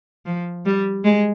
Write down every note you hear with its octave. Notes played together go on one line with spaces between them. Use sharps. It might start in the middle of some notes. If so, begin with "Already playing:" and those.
F3
G3
G#3